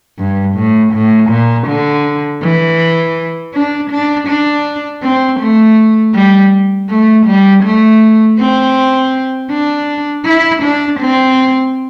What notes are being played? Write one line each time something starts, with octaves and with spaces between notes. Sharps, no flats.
G2
A2
A2
A#2
D3
E3
D4
D4
D4
C4
A3
G3
A3
G3
A3
C4
D4
E4
D4
C4